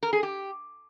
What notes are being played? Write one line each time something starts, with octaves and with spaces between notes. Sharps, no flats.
A#4
G#4
G4